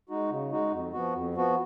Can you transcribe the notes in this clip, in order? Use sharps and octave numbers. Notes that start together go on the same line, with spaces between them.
G#3 D#4 F#4
C#3
G#3 D#4 F#4
F2
F3 B3 F#4
F2
F3 B3 F#4